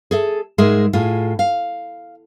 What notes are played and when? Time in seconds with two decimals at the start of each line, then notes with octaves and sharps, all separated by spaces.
0.11 G#4 A4 E5
0.58 G#2 G#3 G#4 A#4 D#5 E5
0.93 A2 F4 G#4
1.39 F5